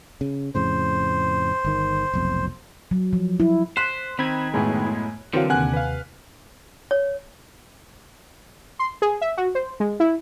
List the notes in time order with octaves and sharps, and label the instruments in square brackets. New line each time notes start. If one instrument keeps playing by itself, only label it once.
[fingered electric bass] C#3
[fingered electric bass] F2 A2 C#3 [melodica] C5
[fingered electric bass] G1 D#3
F1 B1 F2
[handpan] F#3
F3
E4
[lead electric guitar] C5 [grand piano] C6 F#6 B6
[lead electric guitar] D#3 [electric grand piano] C4 [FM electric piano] B5 G#6
[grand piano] F#2 A2 [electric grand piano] G#3 B3
[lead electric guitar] D3 [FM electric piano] E3 F#3 [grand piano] C4 [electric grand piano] A#4 B4 F5
[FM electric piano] D#2 C3 [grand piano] F#5 G#5 F#6
[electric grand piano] B4 F5
[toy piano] C#5
[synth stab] C6
G#4
E5
F#4
C5
G#3
E4